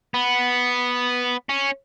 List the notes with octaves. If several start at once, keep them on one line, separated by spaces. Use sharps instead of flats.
B3
C#4